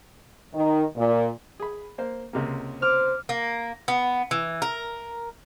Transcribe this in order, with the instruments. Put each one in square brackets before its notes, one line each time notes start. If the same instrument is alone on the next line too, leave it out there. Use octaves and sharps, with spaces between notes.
[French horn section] D#3
A#2
[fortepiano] G#4 B5
A#3 C5
C#2 C3 A#3
[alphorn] C5 [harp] D6 F6
[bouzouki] A#3
B3
E3
A#4